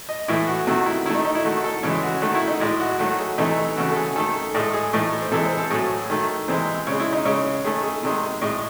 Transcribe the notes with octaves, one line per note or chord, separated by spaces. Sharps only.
D#5
A2 E3 A3 E4
F#4
C3 D#3 A3 F#4
E4
D#3 A3 E4
D#4
D#4
E4
D#3 A3 F#4
A4
C#3 E3 G#3 C#5
F#4
D#3 A3 F#4
E4
D#4
A2 G#3 E4
F#4
D#3 F#3 A3 F#4
G#4
C3 E3 A3 D#4
C#3 E3 A3 F#4
A4
G#4
D#3 A3 A4
A2 G#3 A4
G#4
A2 E3 A3 D#4
C5
C3 E3 G#3 A4
C5
A4
A2 F#3 A3 G#4
D#3 A3
C3 E3 G#3 C5
C#3 G#3 C#5
E4
D#4
C#3 G#3 C#5
D#3 A3 G#4
G#4
C3 D#3 G#3
A2 G#3